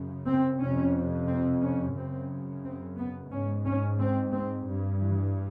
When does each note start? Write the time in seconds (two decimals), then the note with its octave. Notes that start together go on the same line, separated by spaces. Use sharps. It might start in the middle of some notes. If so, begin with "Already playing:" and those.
Already playing: F#2 C#3
0.27 C4
0.60 F2 C3 C#4
1.27 C4
1.62 C#4
1.96 F#2 C#3 C4
2.64 C4
2.97 B3
3.30 G#2 C#4
3.65 C#4
3.99 C4
4.33 C4
4.67 G2
5.00 E3